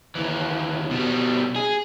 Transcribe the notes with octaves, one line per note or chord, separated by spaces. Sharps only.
D#2 E3
B2 G3
G#4